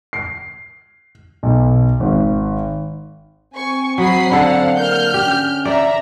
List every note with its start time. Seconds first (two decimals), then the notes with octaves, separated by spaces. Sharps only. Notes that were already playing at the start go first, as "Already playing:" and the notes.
0.13 C7
1.43 B1
2.00 G#1
3.54 C4 G#5 C#6
3.98 F#3 B5 D#6 C7
4.31 D3 A4 F5 F#5
4.76 A#3 F6 G6
5.14 C#4 G4
5.65 D5 E5 A#5